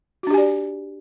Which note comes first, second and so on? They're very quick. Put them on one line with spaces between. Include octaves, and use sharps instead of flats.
F#4 D4 G4 G#5 D5